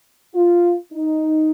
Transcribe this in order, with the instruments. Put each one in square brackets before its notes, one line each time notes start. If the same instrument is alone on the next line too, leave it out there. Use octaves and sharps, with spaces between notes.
[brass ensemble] F4
D#4